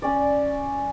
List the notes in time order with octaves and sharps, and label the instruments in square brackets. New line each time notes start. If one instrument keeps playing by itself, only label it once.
[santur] C#4 D5